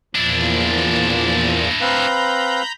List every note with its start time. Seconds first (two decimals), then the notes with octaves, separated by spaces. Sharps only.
0.15 E2 A#2 F3 D4 E4
1.81 C4 B4 F5 A#5 B5 G6